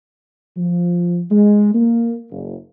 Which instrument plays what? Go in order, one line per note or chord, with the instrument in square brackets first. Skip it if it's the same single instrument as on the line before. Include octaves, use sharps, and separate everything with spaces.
[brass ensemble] F3
G#3
A#3
F#1